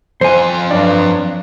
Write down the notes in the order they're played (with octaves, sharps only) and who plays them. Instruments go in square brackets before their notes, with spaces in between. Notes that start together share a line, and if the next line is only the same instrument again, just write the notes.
[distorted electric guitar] F2 F4 [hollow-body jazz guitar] C5 G#5
[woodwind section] G2 F#3 [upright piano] D4